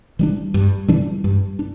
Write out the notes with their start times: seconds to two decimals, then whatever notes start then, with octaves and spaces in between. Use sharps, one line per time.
0.19 E3 G3 D4
0.54 G2
0.88 E3 G3 D4
1.24 G2
1.59 D4